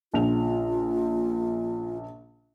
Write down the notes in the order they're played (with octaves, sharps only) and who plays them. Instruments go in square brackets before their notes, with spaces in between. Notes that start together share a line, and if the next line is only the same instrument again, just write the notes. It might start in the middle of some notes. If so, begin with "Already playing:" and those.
[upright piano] A#1 C#3 F7 [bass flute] F4